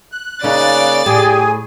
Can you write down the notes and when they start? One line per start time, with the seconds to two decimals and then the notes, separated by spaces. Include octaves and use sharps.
0.12 F#6
0.44 C#3 A#3 C#4 D#4 D5 A6
1.06 A2 G4 G#4 G#5